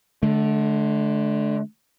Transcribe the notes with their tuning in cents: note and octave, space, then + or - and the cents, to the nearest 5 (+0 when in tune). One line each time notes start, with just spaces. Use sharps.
D3 +0 A3 -45